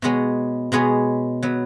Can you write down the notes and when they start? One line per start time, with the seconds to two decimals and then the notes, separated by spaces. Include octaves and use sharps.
0.02 B2 G#3 B3 G#4 C#5
0.72 B2 G#3 B3 G#4 C#5
1.43 F#3 B3